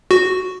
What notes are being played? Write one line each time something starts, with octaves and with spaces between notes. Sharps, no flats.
F#4